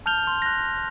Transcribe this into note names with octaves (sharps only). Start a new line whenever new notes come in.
A5 F6 G6 F7 G7
C6
F#6 A#6